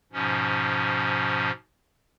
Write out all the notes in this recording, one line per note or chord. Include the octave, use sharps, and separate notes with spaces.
G#2 B2 F3 C#4